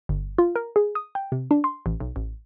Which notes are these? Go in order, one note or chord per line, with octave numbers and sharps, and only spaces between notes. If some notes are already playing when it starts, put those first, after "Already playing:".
G1
F4
A#4
G#4
D#6
G5
C3
D4
C6
A1
B1
A1